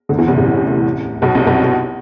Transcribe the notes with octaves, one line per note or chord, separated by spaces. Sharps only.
D2 D3
E2 E3
C2 C3
A1 A2
B1 B2
C2 C3
B1 B2